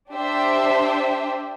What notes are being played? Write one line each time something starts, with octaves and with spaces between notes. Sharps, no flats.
D4 G4 C5 E5